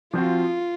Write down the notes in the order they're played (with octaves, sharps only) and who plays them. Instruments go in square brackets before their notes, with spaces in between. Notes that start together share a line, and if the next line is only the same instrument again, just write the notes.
[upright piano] F3 C4 F#4 [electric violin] F4